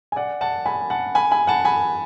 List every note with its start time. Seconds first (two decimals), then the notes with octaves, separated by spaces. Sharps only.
0.12 G#5
0.16 D5 F#5
0.41 F#5 A5
0.66 G#5 B5
0.90 F#5 A5
1.15 G#5 B5
1.31 G#5 B5
1.47 F#5 A5
1.65 G#5 B5